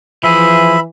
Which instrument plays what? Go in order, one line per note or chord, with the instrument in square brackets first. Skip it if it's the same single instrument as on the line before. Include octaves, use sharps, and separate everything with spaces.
[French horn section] E3 [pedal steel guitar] F3 G#4 [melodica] E5 [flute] B5